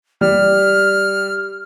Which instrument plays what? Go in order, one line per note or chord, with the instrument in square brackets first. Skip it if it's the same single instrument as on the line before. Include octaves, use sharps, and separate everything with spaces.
[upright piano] G3 [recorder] F6